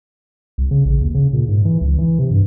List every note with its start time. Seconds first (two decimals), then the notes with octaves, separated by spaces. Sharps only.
0.58 C2
0.71 C#3
0.85 A1
1.01 D#2
1.14 C#3
1.33 A#2
1.49 G#2
1.65 E3
1.81 C#2
1.98 E3
2.19 C3
2.31 G2